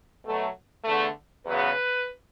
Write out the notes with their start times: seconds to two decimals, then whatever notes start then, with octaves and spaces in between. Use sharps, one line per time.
0.24 B2 F#3 A3
0.85 E2 D3 A3
1.46 E2 C#3 F#3 B3 B4